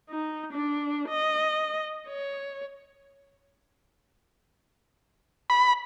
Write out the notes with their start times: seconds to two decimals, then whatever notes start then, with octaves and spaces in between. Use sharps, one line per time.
0.10 D#4
0.53 D4
1.09 D#5
2.08 C#5
5.50 B5